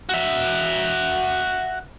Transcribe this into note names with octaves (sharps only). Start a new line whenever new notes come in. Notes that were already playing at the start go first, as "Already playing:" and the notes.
F#4 E5